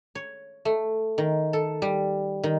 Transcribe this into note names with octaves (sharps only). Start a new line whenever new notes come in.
C#5
A3
D#3
A4
G3
D#3